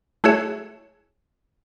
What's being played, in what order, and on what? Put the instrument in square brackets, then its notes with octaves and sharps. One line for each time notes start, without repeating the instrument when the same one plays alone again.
[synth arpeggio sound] A3 E4 F#4 G#4 C#5 E5